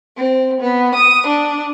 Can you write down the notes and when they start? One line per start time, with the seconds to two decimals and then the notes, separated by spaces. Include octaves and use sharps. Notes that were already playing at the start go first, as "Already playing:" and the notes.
0.16 C4
0.61 B3
0.94 D#6
1.26 D4